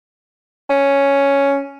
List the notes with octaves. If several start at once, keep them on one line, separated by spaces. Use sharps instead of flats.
C#4